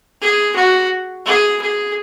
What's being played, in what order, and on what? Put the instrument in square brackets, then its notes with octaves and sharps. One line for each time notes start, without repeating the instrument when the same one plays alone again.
[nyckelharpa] G#4
F#4
G#4
G#4